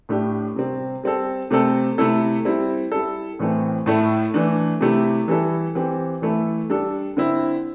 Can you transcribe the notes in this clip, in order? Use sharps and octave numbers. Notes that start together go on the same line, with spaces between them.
A2 A3 D4 G4
C3 G3 C4
G3 C4 A4
C3 A3 C4 A4
C3 A3 E4 A4
G3 C4 E4
G3 E4 A4
A2 E3 A3 C4
A2 A3 E4 A4
E3 A3 D4
C3 A3 E4 G4
E3 G3 E4 A4
E3 C4 G4
E3 A3 E4 A4
G3 D4 A4
D3 C4 E4